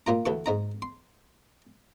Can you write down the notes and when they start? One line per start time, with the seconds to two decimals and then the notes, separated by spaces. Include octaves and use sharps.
0.07 A#2 A#3 F4 A#5
0.26 D2 E3 A4 C#6
0.46 G#2 D#4 A#5
0.82 C6